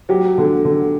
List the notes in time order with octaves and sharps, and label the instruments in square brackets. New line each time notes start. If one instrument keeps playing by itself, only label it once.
[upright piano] F#3 [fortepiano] G4
[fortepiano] D3
D3